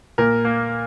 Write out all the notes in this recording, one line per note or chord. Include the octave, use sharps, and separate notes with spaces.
A#2 A#4
A#3